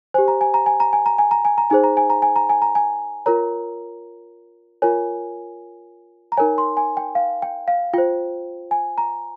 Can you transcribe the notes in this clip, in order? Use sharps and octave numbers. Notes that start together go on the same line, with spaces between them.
G4 C5 G#5
A#5
G#5
A#5
G#5
A#5
G#5
A#5
G#5
A#5
G#5
A#5
D#4 G#4 C5 G#5
A#5
G#5
A#5
G#5
A#5
G#5
A#5
G#5
F4 A#4 C#5 A#5
F4 A#4 C#5 G#5
A#5
D#4 A#4 C#5 G#5
C6
G#5
G5
F5
G5
F5
F4 C5 G5
G#5
A#5